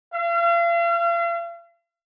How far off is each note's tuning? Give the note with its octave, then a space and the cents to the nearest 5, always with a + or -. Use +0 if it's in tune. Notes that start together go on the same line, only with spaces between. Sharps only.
F5 -40